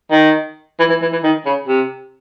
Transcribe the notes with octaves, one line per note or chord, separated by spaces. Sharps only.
D#3
E3
E3
E3
E3
D#3
C#3
C3